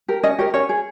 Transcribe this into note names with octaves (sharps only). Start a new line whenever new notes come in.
G4 A#4
C#4 D#5
G4 A#4 C#5
C#4 C#5
G#4